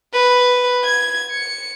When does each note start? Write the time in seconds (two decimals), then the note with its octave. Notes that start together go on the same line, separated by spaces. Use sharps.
0.13 B4
0.84 G#6
1.32 C#7